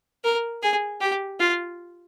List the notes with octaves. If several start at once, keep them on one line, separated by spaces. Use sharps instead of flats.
A#4
G#4
G4
F4